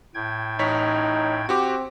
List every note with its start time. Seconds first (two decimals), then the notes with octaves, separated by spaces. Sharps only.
0.15 A2 G5 G#6
0.59 A1 D#4 C#5 B6
1.49 C4 F#4 G4 D6